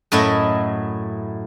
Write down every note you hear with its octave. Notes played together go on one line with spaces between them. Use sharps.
F#2 A2 A3 E4 D#5